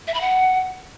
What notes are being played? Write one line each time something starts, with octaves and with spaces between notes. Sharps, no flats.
E5
B5
F#5